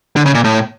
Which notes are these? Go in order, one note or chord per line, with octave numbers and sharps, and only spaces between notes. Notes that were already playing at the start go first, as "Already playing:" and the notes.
D3
C#3
A#2
A2